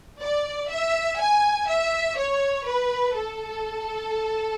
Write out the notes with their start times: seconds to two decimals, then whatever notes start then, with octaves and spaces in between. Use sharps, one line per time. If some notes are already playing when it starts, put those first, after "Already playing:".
0.20 D5
0.69 E5
1.18 G#5
1.67 E5
2.17 C#5
2.65 B4
3.15 A4